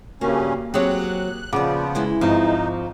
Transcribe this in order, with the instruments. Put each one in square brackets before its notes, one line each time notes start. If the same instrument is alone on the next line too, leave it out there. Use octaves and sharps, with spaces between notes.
[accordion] G2 C#3 C#4 [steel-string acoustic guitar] A#3 [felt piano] F#4 G4
[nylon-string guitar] F#3 C4 [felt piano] G4 G#4 C#5 [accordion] F#6
[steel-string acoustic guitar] A#2 D5 [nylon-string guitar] C#3 [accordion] F3 B3 [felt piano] F#5 D6
[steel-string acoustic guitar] E3 G#3 E4
[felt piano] G#1 [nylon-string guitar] F3 [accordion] D#4